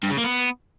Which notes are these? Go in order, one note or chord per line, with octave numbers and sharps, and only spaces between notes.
G2
C#3
A#3
B3